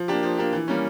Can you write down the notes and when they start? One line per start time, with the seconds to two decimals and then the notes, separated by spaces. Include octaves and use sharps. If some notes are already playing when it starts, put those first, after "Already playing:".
Already playing: F3
0.08 A#3 D4 G4
0.23 F3
0.38 A#3 D4 G4
0.53 E3
0.68 G3 A#3 C#4